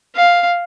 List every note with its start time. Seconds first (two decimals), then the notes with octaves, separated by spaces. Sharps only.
0.16 F5